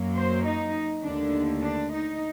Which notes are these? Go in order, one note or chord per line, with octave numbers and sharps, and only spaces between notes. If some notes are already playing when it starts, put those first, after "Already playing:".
Already playing: F#2 F#3 A#3
C5
D#4
D#2 D3 A3 D4
D4
D#4